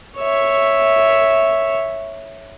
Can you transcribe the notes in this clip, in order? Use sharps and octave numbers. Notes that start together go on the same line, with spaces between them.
C#5 E5